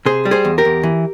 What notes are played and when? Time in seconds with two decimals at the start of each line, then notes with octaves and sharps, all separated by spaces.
0.06 C3 G#4 C5
0.25 G3
0.31 G#4 C5
0.45 E2
0.58 G4 A#4
0.65 E2
0.83 E3